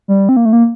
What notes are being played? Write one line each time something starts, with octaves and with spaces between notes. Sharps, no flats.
G3
C4
A#3
A3
A#3